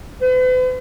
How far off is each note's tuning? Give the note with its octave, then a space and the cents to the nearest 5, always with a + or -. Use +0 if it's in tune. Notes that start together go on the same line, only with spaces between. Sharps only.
B4 +45